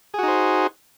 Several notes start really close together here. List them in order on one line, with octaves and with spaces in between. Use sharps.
G#4 F#4 D#4 C5